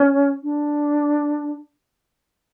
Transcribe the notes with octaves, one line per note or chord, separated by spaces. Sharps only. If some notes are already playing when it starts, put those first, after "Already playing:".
Already playing: C#4
D4